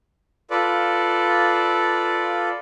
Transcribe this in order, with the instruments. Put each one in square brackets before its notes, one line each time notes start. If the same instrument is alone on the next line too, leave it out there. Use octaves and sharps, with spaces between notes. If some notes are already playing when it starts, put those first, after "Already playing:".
[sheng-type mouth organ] F4 A4 B4 D5